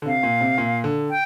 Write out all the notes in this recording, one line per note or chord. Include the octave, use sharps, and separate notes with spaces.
D3
C3 F5
A#2
C3
A#2
D3
G5